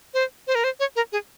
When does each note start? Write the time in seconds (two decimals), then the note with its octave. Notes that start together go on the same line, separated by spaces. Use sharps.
0.14 C5
0.47 C5
0.55 A#4
0.64 C5
0.80 C#5
0.96 A#4
1.12 G#4